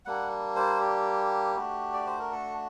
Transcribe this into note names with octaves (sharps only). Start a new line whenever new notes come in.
G3 A#3 D4 F#5
C5
G4
A3 D4 F#4
D5
C5
A#4
A4